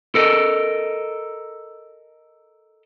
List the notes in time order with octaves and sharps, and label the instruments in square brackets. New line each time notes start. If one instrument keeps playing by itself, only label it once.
[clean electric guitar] A4 A#4 D#5